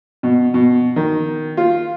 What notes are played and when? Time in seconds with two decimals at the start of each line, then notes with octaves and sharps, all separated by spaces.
0.23 B2
0.54 B2
0.96 D#3
1.57 F4